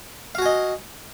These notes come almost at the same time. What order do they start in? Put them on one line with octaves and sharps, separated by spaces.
F5 F#4 G#5 D#5